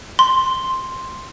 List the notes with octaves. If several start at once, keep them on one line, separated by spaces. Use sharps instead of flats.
C6